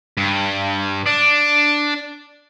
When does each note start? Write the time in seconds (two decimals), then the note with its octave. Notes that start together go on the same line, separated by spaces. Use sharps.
0.17 G2
1.06 D4